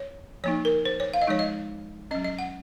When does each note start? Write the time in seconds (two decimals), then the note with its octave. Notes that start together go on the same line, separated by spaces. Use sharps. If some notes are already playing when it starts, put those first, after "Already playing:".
Already playing: C#5
0.44 F3 A#3 D#4 C#5
0.65 A#4
0.85 C5
1.00 C#5
1.14 F5
1.22 D#5
1.27 F3 G#3 D#4 C#5
1.39 D#5
2.11 F#3 C#4 D#5
2.24 D#5
2.39 F#5